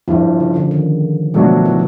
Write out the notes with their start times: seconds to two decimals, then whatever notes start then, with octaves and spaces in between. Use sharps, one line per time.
0.08 G1 G2 E3 F3
0.40 C#3
0.56 D3
0.71 D#3
1.34 B2 F3 F#3 A3 D4 F#4
1.65 E3